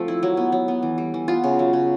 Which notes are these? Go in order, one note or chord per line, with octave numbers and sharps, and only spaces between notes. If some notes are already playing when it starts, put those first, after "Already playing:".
Already playing: F3 A3 C4
E4
F#3
B3
F#3
B3
E3
G3
E3
B3 F4
C#3
F#3
C#3